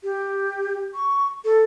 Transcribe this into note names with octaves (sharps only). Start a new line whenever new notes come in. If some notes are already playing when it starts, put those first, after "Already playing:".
G4
C#6
A4